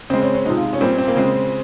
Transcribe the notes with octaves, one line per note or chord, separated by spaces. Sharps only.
C#3 G#3 C4
C#4
C#4
C3 F3 G#3 D#4
F4
C#4
A#2 G3 C4
C4
A#3
C#3 G#3 C4